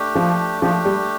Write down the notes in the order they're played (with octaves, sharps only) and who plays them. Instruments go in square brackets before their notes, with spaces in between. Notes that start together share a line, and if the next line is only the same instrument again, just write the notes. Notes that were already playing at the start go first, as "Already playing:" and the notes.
Already playing: [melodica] A3 D4 G4
[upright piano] F3
[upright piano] F3 [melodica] A3 D4 G4
[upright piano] G3